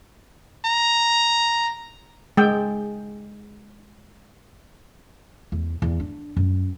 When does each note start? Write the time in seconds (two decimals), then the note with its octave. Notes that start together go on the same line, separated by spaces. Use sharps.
0.65 A#5
2.37 G#3 G5
5.52 E2
5.82 E2
6.00 D4
6.37 F#2